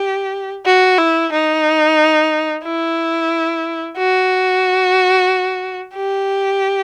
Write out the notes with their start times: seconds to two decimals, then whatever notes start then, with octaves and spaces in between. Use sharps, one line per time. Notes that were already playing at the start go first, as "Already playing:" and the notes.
Already playing: G4
0.66 F#4
0.98 E4
1.32 D#4
2.64 E4
3.97 F#4
5.95 G4